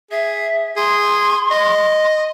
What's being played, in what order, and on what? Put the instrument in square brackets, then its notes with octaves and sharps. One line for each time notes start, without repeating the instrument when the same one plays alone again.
[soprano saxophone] G#4 [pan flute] E5
[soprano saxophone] G#4 [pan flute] C6
[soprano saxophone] D#5